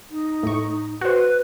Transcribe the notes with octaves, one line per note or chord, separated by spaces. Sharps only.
D#4
A2 C#6
F#4 B4 C5